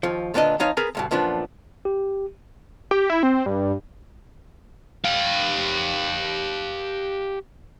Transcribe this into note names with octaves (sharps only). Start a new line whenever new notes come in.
D#2 F3
D2 A#2 B3 D4 D#5
F3 B3 D#4 C#5 D#5 F5
B3 G#4 A#4 B4
D2 G2 B2
F#2 A#2 F3 B3 D4
G4
G4
E4
C4
G2
G4 F5